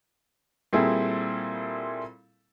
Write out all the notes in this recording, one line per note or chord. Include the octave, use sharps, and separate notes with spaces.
A#2 G3 C4 E4 G#4 A4